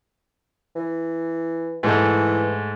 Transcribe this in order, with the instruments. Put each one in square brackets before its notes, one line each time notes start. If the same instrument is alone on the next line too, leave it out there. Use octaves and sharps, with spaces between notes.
[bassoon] E3
[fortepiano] G#2 A3 [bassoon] E3